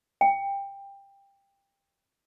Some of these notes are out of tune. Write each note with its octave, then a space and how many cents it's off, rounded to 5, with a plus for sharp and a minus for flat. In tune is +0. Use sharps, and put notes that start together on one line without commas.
G5 +15